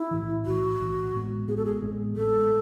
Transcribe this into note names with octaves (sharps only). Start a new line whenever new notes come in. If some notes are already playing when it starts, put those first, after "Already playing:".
Already playing: E4
B1 A2 E3
B1 A2 E3 F#4
B1 A2 E3
A1 A2 G#3 B3
A1 A2 G#3 B3 G#4
A4
G#4
A1 A2 G#3 B3
A1 A2 G#3 B3 A4